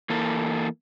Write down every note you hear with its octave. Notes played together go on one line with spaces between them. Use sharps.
E3 A#3 A4